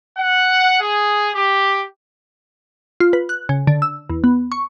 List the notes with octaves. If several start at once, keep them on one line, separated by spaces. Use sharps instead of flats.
F#5
G#4
G4
F4
B4
F#6
C#3
D3
E6
E2
B3
C#6